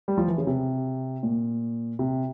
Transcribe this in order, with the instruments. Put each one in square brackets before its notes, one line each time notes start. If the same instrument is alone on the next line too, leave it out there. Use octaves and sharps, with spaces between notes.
[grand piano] G3
F3
E3
C#3
C3
A#2
C3